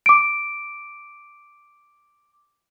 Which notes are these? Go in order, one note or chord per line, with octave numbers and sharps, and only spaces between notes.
D6 D7